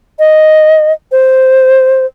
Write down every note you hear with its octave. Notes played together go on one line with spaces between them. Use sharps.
D#5
C5